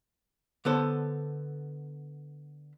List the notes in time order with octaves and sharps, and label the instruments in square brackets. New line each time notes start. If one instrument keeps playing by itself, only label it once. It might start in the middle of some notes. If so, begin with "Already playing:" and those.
[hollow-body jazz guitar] D3 B3 A4 C5